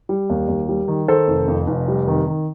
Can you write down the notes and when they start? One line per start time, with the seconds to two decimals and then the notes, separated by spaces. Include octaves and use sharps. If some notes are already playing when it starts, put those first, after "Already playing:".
0.09 G3
0.30 D#2
0.48 D#2
0.69 G3
0.88 D#3
1.08 D#3 A4 C5
1.28 F1
1.48 F2
1.67 F1
1.88 G3
2.07 D#3
2.27 D#3